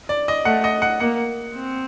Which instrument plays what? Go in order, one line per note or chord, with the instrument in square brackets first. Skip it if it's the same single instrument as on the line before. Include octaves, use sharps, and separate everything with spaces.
[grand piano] D5
D#5
[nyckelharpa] A3 [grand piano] F#5
[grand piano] D#5
F#5
[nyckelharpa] A#3 [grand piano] F#5
[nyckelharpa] C4